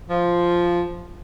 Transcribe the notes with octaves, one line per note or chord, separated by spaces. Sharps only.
F3